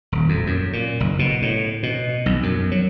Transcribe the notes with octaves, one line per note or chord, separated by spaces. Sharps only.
D#1
F2
F#2
A#2
F#1
B2
A2
B2
B1
F#2
F#3